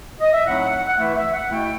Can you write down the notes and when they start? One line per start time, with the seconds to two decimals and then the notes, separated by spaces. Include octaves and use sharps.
0.21 D#5
0.34 E5
0.47 A2 F#3 A3 C4 D#4 F#5
0.86 F#5
0.98 E3 A3 E4 E5
1.15 E5
1.33 F#5
1.50 B2 A3 E4 G5